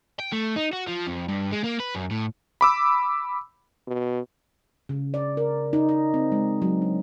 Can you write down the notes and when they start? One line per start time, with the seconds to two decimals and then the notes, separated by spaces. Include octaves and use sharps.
0.20 G5
0.32 A3
0.56 D#4
0.73 F#4
0.88 F3
1.07 F2
1.28 G2
1.52 G#3
1.64 A#3
1.80 B4
1.95 F#2
2.11 A2
2.61 B5 D6 E6
3.88 B2
4.89 C#3
5.14 D5
5.37 A#4
5.73 D#4
5.89 D#5
6.14 C4
6.32 G#3
6.62 F#3
6.82 D4